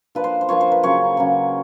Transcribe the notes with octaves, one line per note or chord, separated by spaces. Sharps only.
F3 A#3 D4 F4 B4
C5
C5
F3 A#3 D4 F4 C#5
C5
B4
C#3 F#3 A#3 C#5
C#3 F#3 A#3